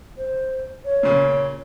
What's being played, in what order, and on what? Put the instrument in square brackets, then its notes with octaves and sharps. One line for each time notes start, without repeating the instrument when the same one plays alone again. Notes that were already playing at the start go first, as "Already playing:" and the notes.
[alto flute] C5
C#5
[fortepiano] A#2 C#3